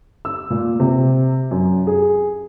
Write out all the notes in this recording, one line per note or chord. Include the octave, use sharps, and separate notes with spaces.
E6
A#2
C3
F#2
G#4